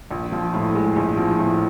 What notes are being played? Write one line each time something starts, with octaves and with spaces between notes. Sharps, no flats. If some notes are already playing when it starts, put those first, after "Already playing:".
A#1
F3
A2
G#3
A#1
F3
A2